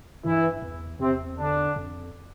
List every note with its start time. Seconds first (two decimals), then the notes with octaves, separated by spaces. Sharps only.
0.24 G2 E3 E4
0.62 E2
0.99 E2 C3 C4
1.37 D3 D4
1.76 F2